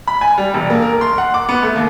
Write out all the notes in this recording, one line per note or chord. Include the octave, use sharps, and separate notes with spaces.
B5
G#5
G3
E1
A#3
A#4
C6
F#5
D6
B3
A3
D#2